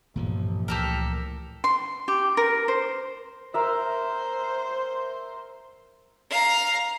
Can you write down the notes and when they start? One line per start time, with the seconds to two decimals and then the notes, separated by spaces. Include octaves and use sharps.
0.16 A1 G2 A#2 E3 F3
0.68 C#2 G4 A4 A#4
1.64 C6
2.08 G4
2.37 A#4
2.68 C5
3.54 A#4 C5 E5
6.30 F5 A#5